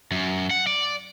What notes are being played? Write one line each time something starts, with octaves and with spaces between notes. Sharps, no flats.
F#2
F#5
D5